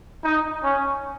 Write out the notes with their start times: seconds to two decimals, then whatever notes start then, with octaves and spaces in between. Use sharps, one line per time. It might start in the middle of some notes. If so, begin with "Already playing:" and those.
0.24 D#4
0.64 C#4